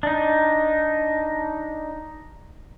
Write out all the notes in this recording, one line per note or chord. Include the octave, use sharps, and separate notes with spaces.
D4 D#4